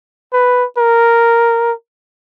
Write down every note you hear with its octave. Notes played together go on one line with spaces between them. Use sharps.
B4
A#4